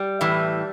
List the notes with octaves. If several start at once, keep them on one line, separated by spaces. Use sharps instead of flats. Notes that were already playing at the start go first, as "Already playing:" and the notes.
Already playing: G3
A2 E3